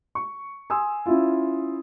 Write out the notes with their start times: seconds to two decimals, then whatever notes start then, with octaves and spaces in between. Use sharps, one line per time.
0.15 C#6
0.70 G#5 C6 D#6 E6
1.06 C#4 E4 F4